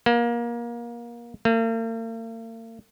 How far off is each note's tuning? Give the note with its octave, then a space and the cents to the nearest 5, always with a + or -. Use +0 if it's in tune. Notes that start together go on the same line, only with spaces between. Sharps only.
A#3 +25
A#3 -45